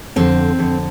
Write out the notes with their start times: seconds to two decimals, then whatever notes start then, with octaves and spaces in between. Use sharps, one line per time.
0.16 F2 D3 C4
0.59 F2 D3